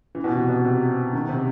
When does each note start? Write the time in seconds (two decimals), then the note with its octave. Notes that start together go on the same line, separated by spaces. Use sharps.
0.15 E3
0.24 B2
0.32 C3
0.49 B2
0.64 C3
1.13 D#3
1.29 C3